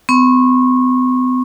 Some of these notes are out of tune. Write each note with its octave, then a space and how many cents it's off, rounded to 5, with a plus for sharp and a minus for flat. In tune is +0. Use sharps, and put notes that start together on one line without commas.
B3 +45 C#6 -30